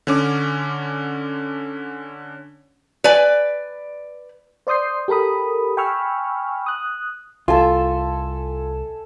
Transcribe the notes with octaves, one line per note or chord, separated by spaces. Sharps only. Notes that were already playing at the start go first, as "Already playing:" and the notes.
D3 C#4 D6
B4 D5 G#5
C5 D5 C6 D#6 G6 C7
G4 A4 A#4 B5 D#6
G5 G#5 B5 C#6 E6 F6
D#6 F#6
C2 F4 A4 E5 G#5